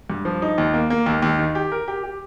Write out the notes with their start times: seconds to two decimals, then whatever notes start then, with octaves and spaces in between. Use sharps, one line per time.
0.10 G2
0.25 F3
0.42 D#4
0.58 D#2
0.74 A#3
0.90 A#3
1.06 D#2
1.22 D#2
1.39 D#3
1.55 G4
1.72 A#4
1.88 G4
2.03 G4